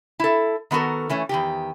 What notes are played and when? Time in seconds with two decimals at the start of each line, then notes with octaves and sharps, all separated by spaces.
0.20 E4 A4
0.71 D#3 B3 F#4 A4 A#4
1.10 E3 A3 C#4
1.29 E2 D#3 G4